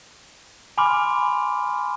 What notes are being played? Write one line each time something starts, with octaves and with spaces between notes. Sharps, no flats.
G#5 B5 C6 D6 F6